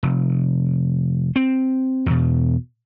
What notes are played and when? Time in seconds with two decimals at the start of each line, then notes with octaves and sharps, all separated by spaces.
0.03 F1
1.36 C4
2.06 E2 B2